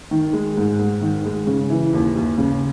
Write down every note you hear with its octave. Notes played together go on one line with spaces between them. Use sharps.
D#3
G#3
G#2
G#2
D#3
G#3
C#3
E3
D#2
D#2
C#3